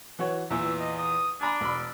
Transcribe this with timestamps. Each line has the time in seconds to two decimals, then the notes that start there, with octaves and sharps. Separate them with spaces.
0.19 E3 F#4 C#5
0.50 E2 A#2 E3 E5
0.80 D#5
0.99 D#6
1.41 D4 G#5 A#5 B5
1.61 E1 B5